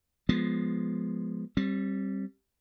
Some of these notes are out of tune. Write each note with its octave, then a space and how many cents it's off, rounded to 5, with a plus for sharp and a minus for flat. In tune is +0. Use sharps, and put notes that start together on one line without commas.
F3 +0 G#3 +0 B3 +0
G3 -5 C4 +30